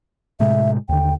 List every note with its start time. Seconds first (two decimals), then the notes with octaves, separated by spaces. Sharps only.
0.40 A2 C3 G#3 E5
0.89 D#2 D3 G5